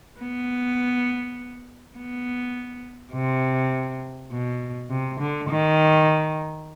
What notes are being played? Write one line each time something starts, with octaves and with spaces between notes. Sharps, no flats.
B3
B3
C3
B2
C3
D3
D#3